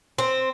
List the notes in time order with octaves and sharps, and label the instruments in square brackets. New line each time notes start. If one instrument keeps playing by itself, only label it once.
[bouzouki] C4